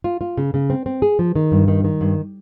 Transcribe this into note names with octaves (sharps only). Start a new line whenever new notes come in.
F4
F4
C#3
C#3
C4
C4
G#4
F3
D#3
G2
D#3
D#3
G2